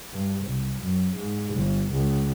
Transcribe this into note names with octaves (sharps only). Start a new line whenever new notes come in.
G2
C2
F#2
G#2
G1
C#2